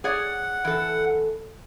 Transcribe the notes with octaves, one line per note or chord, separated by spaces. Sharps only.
G#4 C#5 D5 F#5
E3 A4